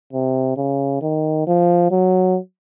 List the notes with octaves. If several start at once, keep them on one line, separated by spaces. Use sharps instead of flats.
C3
C#3
D#3
F3
F#3